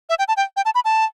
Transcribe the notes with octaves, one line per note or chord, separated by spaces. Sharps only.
E5
G5
A5
G5
G5
A5
B5
A5